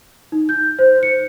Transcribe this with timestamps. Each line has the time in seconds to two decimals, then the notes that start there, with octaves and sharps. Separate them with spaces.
0.32 D#4
0.49 G6
0.79 C5
1.03 C#7